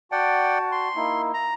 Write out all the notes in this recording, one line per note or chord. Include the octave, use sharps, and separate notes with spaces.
F#4 D5 F#5 G5 A5
C6
A#3 D#4 E4
A#5